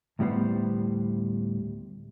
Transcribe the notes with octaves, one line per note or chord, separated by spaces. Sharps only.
D2 A2 G3 B3 C5